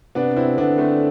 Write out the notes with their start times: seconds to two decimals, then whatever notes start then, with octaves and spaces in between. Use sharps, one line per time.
0.15 C3 B3 D4
0.36 C4 E4
0.58 D3 B3 D4
0.78 A3 C4